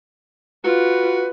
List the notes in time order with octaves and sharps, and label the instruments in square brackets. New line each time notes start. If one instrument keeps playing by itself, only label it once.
[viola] F4 [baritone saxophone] F#4 [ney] B4